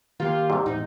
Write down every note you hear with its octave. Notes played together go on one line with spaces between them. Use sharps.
D#3 A#3 F4 G4
G#2 C3 G3
E2 A2 D#4